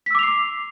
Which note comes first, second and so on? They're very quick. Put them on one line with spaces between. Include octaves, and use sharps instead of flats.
B6 E6 D6 F7 C7